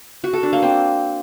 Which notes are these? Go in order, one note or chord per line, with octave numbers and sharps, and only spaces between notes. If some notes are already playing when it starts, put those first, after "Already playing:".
F#4
A4
D4
A#3
C4